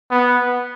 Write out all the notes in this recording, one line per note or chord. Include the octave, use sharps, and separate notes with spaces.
B3